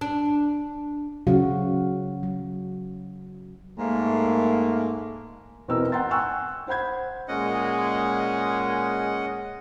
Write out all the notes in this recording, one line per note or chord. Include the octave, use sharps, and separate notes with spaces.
D4
C#3 F#3 F#4 F5
F#3
G#2 A3 A#3
E2 B2 C4 A#4 E6
F#5 G5 A#5 C6 A6
G5 G#5 C#6 E6 F#6
C5 F#5 B5 G6 G#6
A#2 G#3 C#4 D#5 F#5